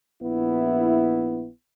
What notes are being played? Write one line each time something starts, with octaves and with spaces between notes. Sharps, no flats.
A#1 B3 E4